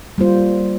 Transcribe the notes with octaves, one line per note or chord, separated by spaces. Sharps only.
G3 A#3 F4 C5